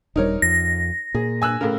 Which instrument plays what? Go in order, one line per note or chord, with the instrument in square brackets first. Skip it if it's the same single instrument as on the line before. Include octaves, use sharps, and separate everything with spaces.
[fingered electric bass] D#1 G3 [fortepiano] D#4 A#4 C#5
[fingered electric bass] F2 [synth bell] A#6
[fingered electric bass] A#2 [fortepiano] G#4
[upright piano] G#5 E6 F#6
[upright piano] A2 C#3 [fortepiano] A#4 F5